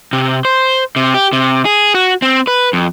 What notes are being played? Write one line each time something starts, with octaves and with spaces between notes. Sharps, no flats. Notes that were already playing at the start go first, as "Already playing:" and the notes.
C3
C5
C3
G4
C3
G#4
F#4
C4
B4
F2